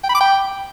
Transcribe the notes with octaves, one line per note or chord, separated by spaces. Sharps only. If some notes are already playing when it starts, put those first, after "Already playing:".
G5
B5
D6
G5